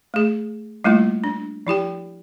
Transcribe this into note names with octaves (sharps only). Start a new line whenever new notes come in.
A3 G#4
G3 A3 A#3 E4 F4
D4
F3 E4 G4 G5